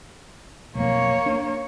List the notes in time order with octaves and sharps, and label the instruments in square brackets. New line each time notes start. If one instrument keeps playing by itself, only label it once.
[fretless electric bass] B1 F2 [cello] A#3 C#5
[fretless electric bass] D4